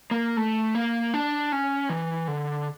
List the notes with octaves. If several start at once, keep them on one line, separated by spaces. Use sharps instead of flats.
A#3
A3
A#3
D4
C#4
E3
D3